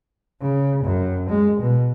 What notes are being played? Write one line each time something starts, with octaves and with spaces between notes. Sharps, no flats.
C#3
F#2
G#3
B2